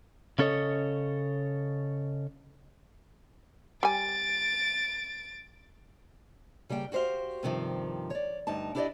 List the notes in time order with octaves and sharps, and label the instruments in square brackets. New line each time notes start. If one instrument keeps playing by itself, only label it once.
[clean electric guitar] C#3 C#4 A4 C#5 D#5
[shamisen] G3 G#5 [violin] A6 D7
[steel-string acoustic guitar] C#3 G3 A#3 F#5 G5
F#4 G4 C5 E5 F5
G2 C3 D#3 F3
C#5 D5
D2 G2 D#4 A5
D4 E4 G4 C5 D5 D#5